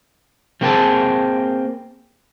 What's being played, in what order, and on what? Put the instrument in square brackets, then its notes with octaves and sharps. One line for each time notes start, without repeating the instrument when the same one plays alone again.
[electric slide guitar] F3 A#3 C4 F#4 G#4 A5